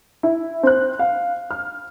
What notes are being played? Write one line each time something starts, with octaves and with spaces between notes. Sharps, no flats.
E4
C4 F#6
F5
F6